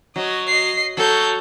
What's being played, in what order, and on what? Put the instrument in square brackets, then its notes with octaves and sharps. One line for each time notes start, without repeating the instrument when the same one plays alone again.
[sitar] F#3 [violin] D#5
[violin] D#5 C7
[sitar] F#3 [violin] A4 G6